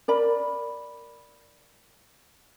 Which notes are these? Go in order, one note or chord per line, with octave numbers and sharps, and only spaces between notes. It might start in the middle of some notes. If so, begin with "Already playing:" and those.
A#4 D5 B5